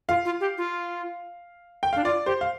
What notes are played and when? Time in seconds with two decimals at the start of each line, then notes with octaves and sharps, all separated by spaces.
0.09 F4 F5
0.25 F4
0.41 G4
0.58 F4
1.83 G5
1.93 D4 F5
2.04 F4 D5
2.26 G4 C5
2.41 F5